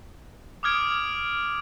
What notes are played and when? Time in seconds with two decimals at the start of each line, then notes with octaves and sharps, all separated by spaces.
0.63 D6 D#6 F6 G#6 D7